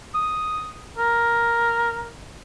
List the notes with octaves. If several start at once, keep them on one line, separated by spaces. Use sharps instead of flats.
D#6
A#4